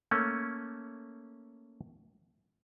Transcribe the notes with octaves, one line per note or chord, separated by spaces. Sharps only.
A3 A#3 C#4